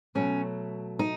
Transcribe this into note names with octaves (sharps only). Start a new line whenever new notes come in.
B2 F#3 A3 C#4
D#4